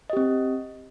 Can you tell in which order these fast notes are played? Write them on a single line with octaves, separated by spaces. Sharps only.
D#5 G4 C4